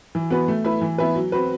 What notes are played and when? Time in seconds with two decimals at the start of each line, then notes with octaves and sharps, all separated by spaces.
0.15 E3
0.31 B3 F#4 B4
0.48 A3
0.65 E4 B4
0.81 E3
0.98 B3 E4 B4
1.15 F#3
1.32 C4 F#4 B4